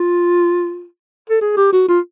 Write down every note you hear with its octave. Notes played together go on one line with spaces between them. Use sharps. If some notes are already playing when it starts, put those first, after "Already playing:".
Already playing: F4
A4
G#4
G4
F#4
F4